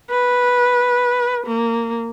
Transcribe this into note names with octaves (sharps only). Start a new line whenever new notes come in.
B4
A#3